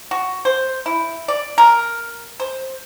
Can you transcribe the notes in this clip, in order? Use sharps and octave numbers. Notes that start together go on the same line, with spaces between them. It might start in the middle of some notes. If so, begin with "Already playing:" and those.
F#4
C5
E4
D5
A#4
C5